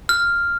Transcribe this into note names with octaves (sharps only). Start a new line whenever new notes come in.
F6